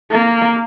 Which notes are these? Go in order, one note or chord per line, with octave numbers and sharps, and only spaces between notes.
A#3